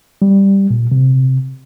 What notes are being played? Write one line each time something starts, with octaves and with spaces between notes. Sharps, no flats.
G3
A#2
C3